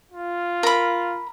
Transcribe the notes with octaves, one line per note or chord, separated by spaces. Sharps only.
F4
A#4 B5